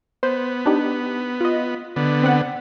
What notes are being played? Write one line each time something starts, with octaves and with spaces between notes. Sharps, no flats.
B3 C5
D4 D#4 G4
F4 D#5
D3 B3
C4 F#5